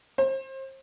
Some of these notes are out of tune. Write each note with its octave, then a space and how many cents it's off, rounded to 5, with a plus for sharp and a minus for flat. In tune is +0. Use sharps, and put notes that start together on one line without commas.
C5 +30